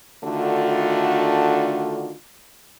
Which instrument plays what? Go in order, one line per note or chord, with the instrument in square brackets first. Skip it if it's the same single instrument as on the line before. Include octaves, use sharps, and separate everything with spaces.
[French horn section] D3 D#3 A3 D4 F4 F#4